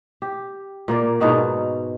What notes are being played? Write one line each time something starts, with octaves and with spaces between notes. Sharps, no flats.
G4
A#2 A#3 D5
G#2 B2 D#4 F#4